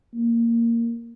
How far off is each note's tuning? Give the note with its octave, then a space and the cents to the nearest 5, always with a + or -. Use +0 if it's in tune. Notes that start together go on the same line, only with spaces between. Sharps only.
A#3 -10